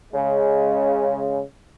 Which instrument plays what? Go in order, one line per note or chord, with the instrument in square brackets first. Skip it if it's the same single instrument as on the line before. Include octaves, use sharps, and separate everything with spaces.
[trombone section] C#3 G#3